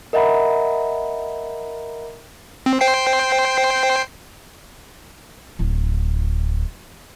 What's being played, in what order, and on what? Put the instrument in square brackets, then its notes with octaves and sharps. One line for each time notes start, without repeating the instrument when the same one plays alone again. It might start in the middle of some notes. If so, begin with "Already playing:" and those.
[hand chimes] A#4 D#5 E5 F#5 A#5 B5
[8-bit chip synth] C4
C5 G5 C7
[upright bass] D1 E4